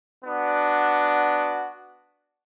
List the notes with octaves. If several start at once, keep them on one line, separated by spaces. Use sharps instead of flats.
B3 D4 F#4